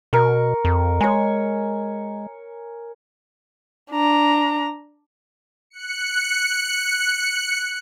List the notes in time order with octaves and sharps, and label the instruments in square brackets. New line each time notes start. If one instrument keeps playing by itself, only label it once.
[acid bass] B2 [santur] A#4 C#6
[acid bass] F2
[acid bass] G#3 [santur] C#5 G#5
[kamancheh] D4 A#5
[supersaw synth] F#6 C#7